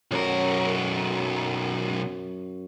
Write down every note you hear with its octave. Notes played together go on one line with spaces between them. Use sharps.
B1 F#2 A#4 C#5